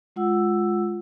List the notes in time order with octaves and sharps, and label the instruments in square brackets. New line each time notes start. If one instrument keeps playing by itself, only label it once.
[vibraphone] G#3 F4 F#5 E6